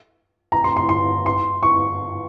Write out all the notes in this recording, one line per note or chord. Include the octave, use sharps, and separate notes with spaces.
A#5
C6
C6
C6
C6
C#6